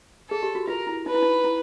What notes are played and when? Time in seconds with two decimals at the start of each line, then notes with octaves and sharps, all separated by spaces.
0.30 G#4 A4
0.43 G4
0.55 F#4
0.67 F4 A#4
0.87 E4
1.06 D#4 B4
1.14 E4
1.22 D#4
1.44 E4